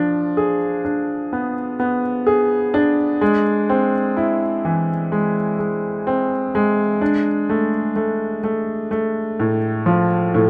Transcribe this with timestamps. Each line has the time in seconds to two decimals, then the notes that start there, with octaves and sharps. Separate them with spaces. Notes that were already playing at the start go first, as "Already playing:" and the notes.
Already playing: F3 D4
0.37 G#4
0.85 D4
1.33 B3
1.80 B3
2.27 G#4
2.74 D4
3.21 G#3
3.69 C4
4.17 E4
4.65 E3
5.12 G#3
5.59 G#3
6.07 C4
6.55 G#3
7.01 D4
7.49 A3
7.96 A3
8.44 A3
8.91 A3
9.40 A2
9.86 F3
10.34 A2